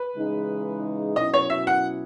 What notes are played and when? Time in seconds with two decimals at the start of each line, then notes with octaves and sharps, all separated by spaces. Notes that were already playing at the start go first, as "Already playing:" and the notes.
Already playing: B4
0.15 C#3 E3 G#3 D#4
1.16 B2 F#3 C#4 E4 D#5
1.34 C#5
1.50 E5
1.67 F#5